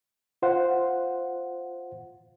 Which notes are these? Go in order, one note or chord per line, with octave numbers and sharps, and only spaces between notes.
F4 C5 F5 F#5